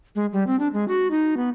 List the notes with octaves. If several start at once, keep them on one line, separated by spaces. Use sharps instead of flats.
G#3
G3
C4
D4
G#3
F#4
D#4
B3